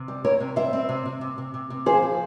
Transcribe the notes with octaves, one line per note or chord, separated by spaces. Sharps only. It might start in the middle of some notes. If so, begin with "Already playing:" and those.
Already playing: C3
G3
G3 A#4 C#5
C3
G3 C5 E5
C4
C3
C3
C3
C3
C3
C3
F3 G#4 C5
F3